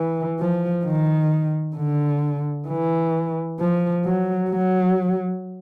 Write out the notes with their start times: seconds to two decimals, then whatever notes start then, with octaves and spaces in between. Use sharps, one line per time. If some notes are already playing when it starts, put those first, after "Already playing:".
Already playing: E3
0.40 F3
0.85 D#3
1.77 D3
2.68 E3
3.60 F3
4.05 F#3
4.50 F#3